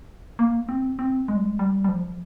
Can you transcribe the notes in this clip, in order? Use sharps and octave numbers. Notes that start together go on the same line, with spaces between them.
A#3
C4
C4
G#3
G3
G#3
G3
G3
F3